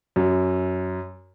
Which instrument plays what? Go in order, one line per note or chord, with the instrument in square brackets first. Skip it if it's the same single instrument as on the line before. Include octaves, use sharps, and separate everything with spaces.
[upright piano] F#2